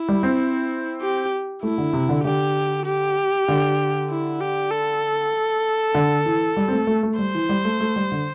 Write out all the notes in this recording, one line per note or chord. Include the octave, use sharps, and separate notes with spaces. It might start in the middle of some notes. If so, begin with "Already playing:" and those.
Already playing: E4
G3
C4
G4
A3 E4
D3
C3
D3
D3 G4
G4
D3
E4
G4
A4
D3
E3
G3
C4
A3
A3
A3
G3 C5
E3
G3
A3
A3
G3
D3